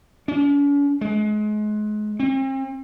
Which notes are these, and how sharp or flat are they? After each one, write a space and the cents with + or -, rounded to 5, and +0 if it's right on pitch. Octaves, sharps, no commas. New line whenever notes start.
C#4 +45
G#3 +30
C4 +40